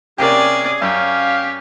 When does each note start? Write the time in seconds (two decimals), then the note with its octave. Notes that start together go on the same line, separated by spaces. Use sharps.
0.18 C3 A#3 C#4 G4 G#4 D5
0.82 F#2 C#4 G4 F5